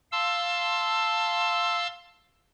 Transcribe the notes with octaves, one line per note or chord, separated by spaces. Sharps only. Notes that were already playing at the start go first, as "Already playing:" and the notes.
F5 A5 C6 E6